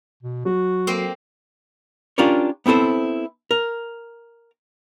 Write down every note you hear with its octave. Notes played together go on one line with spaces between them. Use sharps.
B2
F#3 F#4
A#3 C4
C#4 D4 F4 G4 A#4 C#5
B3 C4 E4 A4 C5
A#4